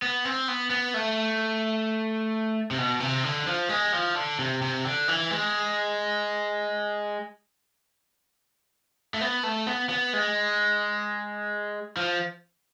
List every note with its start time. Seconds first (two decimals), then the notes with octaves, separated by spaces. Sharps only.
0.02 B3
0.25 C4
0.48 B3
0.70 B3
0.94 A3
2.71 C3
2.78 B2
3.00 C3
3.24 D3
3.47 F3
3.69 G#3
3.93 F3
4.15 D3
4.39 C3
4.62 C3
4.85 D3
5.08 E3
5.31 G#3
9.14 A3
9.21 B3
9.43 A3
9.67 B3
9.89 B3
10.13 G#3
11.97 F3